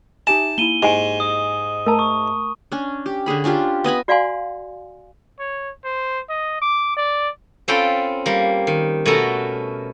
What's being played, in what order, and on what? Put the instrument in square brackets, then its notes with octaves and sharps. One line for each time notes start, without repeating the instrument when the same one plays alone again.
[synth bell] D#4 G4 E5 [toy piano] G#5 [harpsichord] A5
[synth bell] A#3 E4 [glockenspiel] D#7 G7
[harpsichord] G#2 [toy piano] G4 G#5 [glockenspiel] E7
[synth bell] D#5 [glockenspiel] D#6
[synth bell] A3 A#5 [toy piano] A#4 A5
[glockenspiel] C#6 D#6
[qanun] C#4 D4
G4
D3 C#4 G#4 B5
C#4 D4 F4 G4
B3 D#5 G#5 B5
[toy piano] F#4 D5 F5 F#5 G#5 C6
[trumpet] C#5
C5
D#5
D6
D5
[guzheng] C4 C#4 F4 A4 G5 B5
G3 A#3
D#3
B2 A3 C#4 F#4 A4 A#4